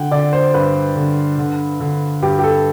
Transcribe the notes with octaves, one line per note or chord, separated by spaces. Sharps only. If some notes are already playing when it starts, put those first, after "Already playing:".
Already playing: D3 F#5 G5
D3 D5
C5
G2 B4
D3
D3
D3
G2 G4
G4
A4